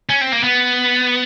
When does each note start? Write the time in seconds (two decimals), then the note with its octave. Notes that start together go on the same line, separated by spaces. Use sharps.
0.09 C#4
0.21 C4
0.32 A#3
0.43 B3